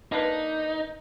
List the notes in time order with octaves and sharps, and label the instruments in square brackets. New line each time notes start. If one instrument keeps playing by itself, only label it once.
[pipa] A#3 D4 B4 [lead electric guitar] D#4